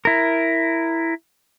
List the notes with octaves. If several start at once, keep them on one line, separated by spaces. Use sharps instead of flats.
E4 A#4